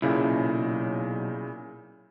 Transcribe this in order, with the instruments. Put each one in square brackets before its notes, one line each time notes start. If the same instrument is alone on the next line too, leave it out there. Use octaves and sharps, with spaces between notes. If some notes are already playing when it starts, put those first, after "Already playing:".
[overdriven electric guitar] B1 [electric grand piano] A#2 C#3 E4